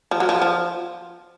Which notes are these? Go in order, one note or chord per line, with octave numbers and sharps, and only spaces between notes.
F3
F#3
F3
F3